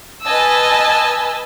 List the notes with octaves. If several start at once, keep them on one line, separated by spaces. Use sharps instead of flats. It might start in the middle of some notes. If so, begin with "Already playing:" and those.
B4 D#5 G#5 A5 E6